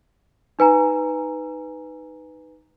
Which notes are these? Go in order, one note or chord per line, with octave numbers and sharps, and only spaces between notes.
D#4 B4 G#5 A#5